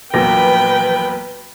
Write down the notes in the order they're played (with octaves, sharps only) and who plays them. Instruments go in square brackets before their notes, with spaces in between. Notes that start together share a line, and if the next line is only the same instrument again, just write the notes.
[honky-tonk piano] A#1 E2 D6 [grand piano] F#3 A#3 A#6 [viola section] B4 [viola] G5